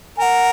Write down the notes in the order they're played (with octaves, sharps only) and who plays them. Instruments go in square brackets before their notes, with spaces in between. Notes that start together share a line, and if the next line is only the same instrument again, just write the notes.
[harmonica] A#4 [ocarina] F#5 G#5